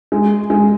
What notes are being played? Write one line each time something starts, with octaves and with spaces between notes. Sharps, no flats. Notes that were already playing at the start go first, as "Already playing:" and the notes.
G#3
G#3